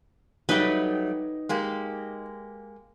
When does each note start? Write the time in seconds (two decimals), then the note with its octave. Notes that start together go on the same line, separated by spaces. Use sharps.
0.49 F#3 G3 A3 D#4 B4 D#5 G5
1.49 G#3 A#3 G4